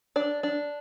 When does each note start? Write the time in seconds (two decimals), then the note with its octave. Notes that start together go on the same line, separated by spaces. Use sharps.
0.16 D4 D5
0.43 D4